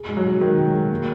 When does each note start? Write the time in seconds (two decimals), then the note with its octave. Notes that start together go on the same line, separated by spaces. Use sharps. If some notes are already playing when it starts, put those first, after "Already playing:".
Already playing: G#4
0.09 G#3
0.17 F#3
0.25 G#3
0.41 D#3 G#3
0.58 G#3
0.74 G#3
0.91 A#3